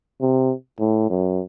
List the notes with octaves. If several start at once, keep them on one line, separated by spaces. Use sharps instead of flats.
C3
A2
F#2